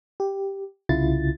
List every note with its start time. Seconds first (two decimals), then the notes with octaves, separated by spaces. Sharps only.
0.20 G4
0.89 C2 C#3 E4 F4 A6